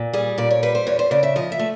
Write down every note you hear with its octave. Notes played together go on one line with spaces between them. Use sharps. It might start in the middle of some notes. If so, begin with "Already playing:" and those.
Already playing: A#2
G3 G#4
A#2 D5
C#5
G3 B4
C5
E2 C#5
C5
C#3 D5
E5
F3 D#5
E5
A3